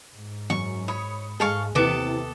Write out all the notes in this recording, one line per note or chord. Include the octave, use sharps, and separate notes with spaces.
G#2
F#2 C#6
C#5 B5 D#6 C#7
G#2 G#3 A4 F5 C#6
D#2 C3 E3 B3 A4 D6